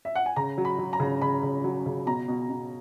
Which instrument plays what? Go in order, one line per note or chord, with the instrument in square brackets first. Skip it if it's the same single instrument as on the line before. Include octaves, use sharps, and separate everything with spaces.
[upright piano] E5
F#5
G#5
C#3 A#5
F#3
B5
F#3
A#5
C#3
C#3 B5
C#3
F#3
C#3
B2 A#5
B2
B2